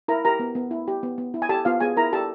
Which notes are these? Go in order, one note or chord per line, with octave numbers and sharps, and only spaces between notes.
E4 A#4 A#5
G4 A#4 A#5
B3
B3
E4
G4
B3
B3
E4
G#5
G4 A4 A5
B3 F4 F5
B3 G#4 G#5
E4 A#4 A#5
G4 A4 A5